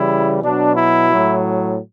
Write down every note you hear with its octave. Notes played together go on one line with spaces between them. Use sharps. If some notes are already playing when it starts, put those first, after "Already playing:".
Already playing: C#3 E3 G3 E4
B2 F#3 D4
E4
A2 F#3